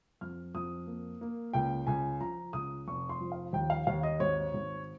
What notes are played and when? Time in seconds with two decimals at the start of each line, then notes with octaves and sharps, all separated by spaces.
0.21 F2 F6
0.54 F2 D#6
0.87 A#3
1.21 A#3
1.53 C#2 G5
1.87 C#2 G#5
2.21 F3 A#5
2.53 C#2 D#6
2.88 F1 C#6
3.09 C6
3.21 F3
3.32 F5
3.53 D#2 G5
3.70 F5
3.87 D#2 F5
4.03 D#5
4.20 G#1 C#5
4.54 G#1